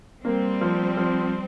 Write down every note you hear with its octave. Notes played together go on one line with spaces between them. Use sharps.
G3 A#3 C4
F3
F3